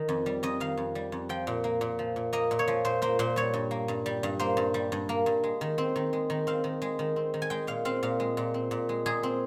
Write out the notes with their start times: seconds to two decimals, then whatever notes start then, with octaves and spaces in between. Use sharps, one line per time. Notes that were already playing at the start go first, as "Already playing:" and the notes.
Already playing: D#3
0.09 F2
0.26 G3
0.43 F2 D#5
0.60 D#3 F5
0.77 F2
0.95 G3
1.12 F2
1.29 F3 G5
1.47 A#2
1.64 A#3
1.81 A#2
1.99 F3
2.16 A#2
2.33 A#3 D#5
2.51 A#2
2.59 C#5
2.68 F3
2.85 A#2 C5
3.02 A#3 C5
3.19 A#2 C5
3.36 G3 C#5
3.54 G2
3.71 A#3
3.88 G2
4.06 G3
4.23 G2
4.39 A#3 C5
4.57 G2
4.74 G3
4.92 G2
5.09 A#3
5.26 G2
5.44 G#3
5.61 D#3
5.78 C4
5.96 D#3
6.13 G#3
6.30 D#3
6.47 C4 F5
6.64 D#3
6.82 G#3
6.99 D#3
7.16 C4
7.34 D#3
7.42 G#5
7.50 G#3 G5
7.67 A#2 F5
7.85 C4 F5
8.03 A#2 F5
8.20 G#3
8.37 A#2
8.54 C4
8.71 A#2
8.89 G#3
9.06 A#2 G#4
9.23 C4